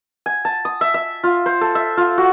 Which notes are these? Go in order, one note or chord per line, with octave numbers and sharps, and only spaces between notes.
G#5
A5
D#6
E5
E5
F4
C5
A4
E5
F4
F#4